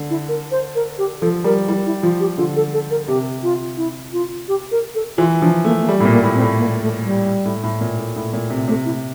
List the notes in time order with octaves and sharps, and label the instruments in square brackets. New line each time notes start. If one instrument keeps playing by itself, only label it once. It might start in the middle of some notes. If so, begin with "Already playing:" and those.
Already playing: [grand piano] D3
[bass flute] E4
A#4
C5
A#4
G4
[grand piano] F3 [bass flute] A4
[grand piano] G3 [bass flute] A#4
[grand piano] G3 [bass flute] E4
[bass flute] E4
[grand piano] F3 [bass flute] F4
[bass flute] G4
[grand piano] D3 [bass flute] F4
[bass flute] A4
A4
A#4
[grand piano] C3 [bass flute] G4
[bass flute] F4
E4
F4
G4
A#4
A4
[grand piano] E3 [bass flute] F4
[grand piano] F3 [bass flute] D4
[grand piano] A3 [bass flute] A#3
[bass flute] A#3
[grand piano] G3 [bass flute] A3
[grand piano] A2
A#2
[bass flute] A#3
[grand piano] A2
[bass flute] C4
[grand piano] A2
[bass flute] A#3
A3
G3
[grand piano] A2
A2
A#2
A2
A2
A#2
C3
[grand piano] C3 [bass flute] A3
[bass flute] E4